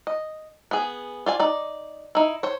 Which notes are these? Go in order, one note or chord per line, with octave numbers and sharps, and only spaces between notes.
D#5
B3 G#4
F4 D5 G#5
D#4 D5
D#4 E4
C5 C#5